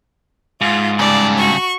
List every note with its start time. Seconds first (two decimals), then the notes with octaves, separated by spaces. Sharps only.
0.61 G#2 F4
0.99 G2 C#3 D5
1.38 F#4 C#6